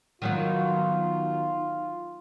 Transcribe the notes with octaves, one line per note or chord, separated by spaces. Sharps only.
D#3 F#3 B3 F4